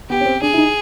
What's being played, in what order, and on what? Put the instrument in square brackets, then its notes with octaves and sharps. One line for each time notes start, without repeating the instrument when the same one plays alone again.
[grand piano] B3 [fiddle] G4
[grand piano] C#4
C4
[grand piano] D4 [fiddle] G#4
[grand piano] E4
D#4